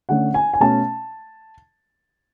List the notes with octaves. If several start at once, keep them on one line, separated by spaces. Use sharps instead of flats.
D3 A3 C#4 F#5
G#5
G#5
B2 A3 C#4 A5